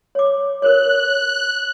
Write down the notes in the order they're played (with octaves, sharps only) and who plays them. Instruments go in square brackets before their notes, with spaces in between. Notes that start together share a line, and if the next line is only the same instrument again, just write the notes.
[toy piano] C#5 D6
[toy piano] A#4 B4 C#5 [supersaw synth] F#6